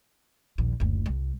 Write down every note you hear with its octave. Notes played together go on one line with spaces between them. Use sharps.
A#1 D#2
F#1 D2
C2